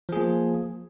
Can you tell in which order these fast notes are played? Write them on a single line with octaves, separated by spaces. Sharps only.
F3 G#4 A#3